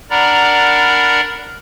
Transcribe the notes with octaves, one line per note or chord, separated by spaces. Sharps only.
D4 A#4 D5 F#5 A#5 B5